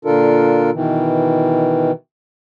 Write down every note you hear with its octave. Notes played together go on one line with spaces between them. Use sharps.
A#2 D3 D4 F4 A4 A#4
B2 D#3 E3